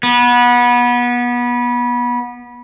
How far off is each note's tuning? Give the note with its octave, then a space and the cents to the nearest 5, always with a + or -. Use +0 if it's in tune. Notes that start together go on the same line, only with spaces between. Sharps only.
B3 -25